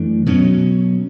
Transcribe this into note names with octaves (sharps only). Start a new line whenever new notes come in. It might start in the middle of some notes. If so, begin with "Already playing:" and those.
Already playing: F#2 E3 A3 D4
B2 F#3 C#4